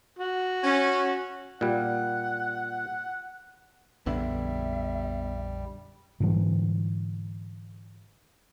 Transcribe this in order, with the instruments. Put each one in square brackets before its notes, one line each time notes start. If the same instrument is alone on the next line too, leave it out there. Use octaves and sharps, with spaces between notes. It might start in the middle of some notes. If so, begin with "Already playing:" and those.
[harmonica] F#4
[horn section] C#4
[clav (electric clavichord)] A#2 G3 [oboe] F#5
[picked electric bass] A#1 F2 D3 [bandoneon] G3 [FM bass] B3 [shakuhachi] E5
[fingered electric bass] G#2 D3 E3 G3